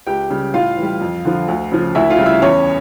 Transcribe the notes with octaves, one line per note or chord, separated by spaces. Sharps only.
C#2 G4 G5
C#3 G3
A2 F4 F5
E3
G3
F2
D3 F3
D2
C#3 F3
D2 E4 E5
F4 F5
C#3 G3
E4 E5
E2 C#4 C#5